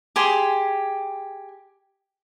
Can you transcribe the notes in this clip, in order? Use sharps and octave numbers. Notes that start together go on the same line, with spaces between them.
G4 G#4 C6